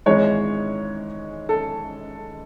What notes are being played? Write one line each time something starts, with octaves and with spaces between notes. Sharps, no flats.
G#1 G#2 E3 G#3 C#5
A4